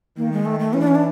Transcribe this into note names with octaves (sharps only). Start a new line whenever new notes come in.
D#3 A#3
G#3
A3
A3
E3 C#4
D4
C#4
D4